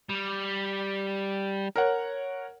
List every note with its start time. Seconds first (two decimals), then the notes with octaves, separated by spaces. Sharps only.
0.09 G3
1.76 A#4 C#5 F#5